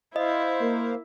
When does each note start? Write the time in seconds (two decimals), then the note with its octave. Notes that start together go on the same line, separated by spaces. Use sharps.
0.16 E4 C5 D#5 F5
0.61 A#3